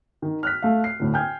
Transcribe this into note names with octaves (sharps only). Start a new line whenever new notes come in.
D#3
F6 F#6 B6
A3 F5
C7
D2 A2
G5 G#5 F6 G6 G#6